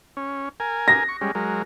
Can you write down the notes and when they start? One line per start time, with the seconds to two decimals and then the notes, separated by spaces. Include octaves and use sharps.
0.17 C#4
0.60 A#4 G#5
0.88 A#6
1.09 C#6
1.21 G3 G#3 C#4
1.35 F#3 G#3 A#4